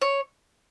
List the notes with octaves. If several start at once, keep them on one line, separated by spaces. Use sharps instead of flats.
C#5